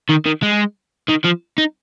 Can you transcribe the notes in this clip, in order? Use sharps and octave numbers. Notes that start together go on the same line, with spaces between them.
D#3
D#3
G#3
D#3
F3
D#4